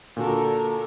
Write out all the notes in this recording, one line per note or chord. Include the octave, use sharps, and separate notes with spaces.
A#2 D3 F#4 A4 A#4